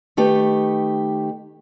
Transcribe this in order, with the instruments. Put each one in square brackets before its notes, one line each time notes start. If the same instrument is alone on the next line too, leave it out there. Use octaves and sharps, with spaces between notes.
[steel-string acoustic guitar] D#3 A3 G4 B4